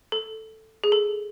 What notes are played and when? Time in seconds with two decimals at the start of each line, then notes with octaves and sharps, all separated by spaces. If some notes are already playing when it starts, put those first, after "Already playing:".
0.12 A4
0.84 G#4
0.92 A4